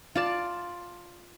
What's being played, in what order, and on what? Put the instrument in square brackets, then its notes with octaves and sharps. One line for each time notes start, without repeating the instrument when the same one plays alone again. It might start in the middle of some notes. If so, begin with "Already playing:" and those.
[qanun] F4 D5 A5